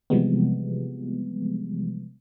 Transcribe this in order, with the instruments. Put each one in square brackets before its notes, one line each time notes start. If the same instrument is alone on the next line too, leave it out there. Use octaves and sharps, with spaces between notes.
[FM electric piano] C3 E3 F3 G3 G#3 B3